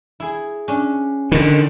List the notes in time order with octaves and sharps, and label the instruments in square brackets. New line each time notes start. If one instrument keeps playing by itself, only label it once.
[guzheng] E4 G#4
C#4 D4
[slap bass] D3 D#3